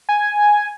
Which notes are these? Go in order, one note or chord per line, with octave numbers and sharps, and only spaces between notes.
G#5